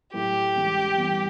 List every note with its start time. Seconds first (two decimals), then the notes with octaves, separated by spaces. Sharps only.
0.13 A2 F#3 A3 E4 G4 A4
0.56 C#2 C#3 E3 G3
0.98 G1 G2 E3 B3